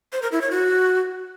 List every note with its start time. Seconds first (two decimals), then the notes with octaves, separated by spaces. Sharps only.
0.13 C5
0.22 A#4
0.32 E4
0.41 C#5
0.51 F#4